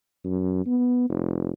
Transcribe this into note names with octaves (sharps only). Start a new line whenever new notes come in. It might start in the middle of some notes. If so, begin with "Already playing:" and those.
F#2
B3
F1